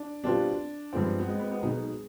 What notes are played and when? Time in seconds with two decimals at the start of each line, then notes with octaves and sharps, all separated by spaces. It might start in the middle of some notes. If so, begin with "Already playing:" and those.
Already playing: D4
0.24 B2 G3 C4 D4 F4 B4
0.93 G2 F3 G#3 B3 C4 F4
1.20 B3
1.28 G#3
1.40 B3
1.51 B3
1.63 B1 B2 B3 D#4 G#4 B4